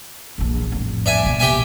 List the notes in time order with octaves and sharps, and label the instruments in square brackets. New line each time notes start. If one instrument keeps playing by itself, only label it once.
[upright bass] A#1 E2
F2 A2
[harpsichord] D4 E5 G#5
[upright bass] A#1 B2
[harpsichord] G4 E5 G#5